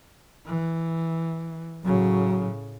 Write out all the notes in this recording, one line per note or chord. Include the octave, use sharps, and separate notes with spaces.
E3
A2 C#3 F#3